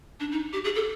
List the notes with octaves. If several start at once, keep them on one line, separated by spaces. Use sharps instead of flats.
D4
D#4
G4
G#4
A4